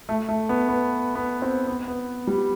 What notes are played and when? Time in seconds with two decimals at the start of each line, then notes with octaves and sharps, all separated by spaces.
0.09 A3
0.28 A3
0.49 B3
0.69 B3
1.15 B3
1.42 C4
1.67 B3
1.88 B3
2.27 G3